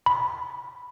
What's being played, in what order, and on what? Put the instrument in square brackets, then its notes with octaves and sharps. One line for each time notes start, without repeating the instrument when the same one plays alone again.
[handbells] B5